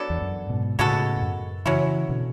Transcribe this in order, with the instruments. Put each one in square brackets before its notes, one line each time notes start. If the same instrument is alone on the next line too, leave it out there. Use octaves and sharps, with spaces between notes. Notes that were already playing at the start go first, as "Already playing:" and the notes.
Already playing: [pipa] F#3 B3 D4 A4
[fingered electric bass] E2
F#2
G#2 B2
[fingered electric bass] A2 C#3 [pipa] G#3 B3 F#4 A4
[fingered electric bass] G#2
F#2
[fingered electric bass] C#3 E3 [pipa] F#3 C#4 E4
[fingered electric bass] B2 D3